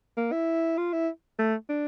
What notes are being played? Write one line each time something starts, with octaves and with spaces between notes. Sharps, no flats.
A#3
E4
F4
E4
A3
D4